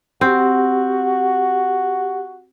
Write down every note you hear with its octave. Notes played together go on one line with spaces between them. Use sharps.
C4 F#4 G4 F#5